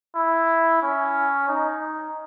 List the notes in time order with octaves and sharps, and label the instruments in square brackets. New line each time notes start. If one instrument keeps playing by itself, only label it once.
[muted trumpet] E4
C#4
D#4